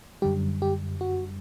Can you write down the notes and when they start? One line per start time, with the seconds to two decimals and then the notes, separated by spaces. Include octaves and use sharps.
0.22 F#2 D3 G3 G4
0.62 G4
1.01 F#4